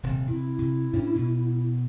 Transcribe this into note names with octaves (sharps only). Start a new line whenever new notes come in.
D#1 C3
C3 E4
C3
A2 C#4 D4
B2